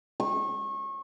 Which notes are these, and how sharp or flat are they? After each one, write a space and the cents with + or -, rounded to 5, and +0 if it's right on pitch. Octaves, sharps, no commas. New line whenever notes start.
C#6 -30